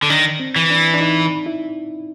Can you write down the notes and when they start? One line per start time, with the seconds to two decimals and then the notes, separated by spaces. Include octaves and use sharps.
0.03 D3
0.10 D#3 D4
0.40 C4
0.56 E3
0.70 D4
0.94 D4
1.01 D#4
1.46 E4